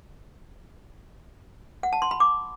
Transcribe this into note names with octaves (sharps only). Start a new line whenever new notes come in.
F#5
A5
C6
B5
D6